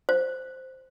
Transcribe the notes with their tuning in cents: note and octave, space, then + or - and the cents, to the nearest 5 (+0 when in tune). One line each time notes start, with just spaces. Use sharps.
C5 -5